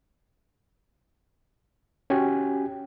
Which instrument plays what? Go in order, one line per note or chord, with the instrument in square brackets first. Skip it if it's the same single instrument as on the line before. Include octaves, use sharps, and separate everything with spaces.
[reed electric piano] C#4 F#4 G4 G5 G#5